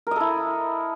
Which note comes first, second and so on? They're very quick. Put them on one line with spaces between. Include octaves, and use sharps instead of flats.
A#4 D#5 A4 E4